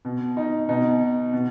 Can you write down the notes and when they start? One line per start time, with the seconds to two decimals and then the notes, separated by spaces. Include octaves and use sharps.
0.05 B2
0.37 D#4
0.69 B2 D#4
1.33 B2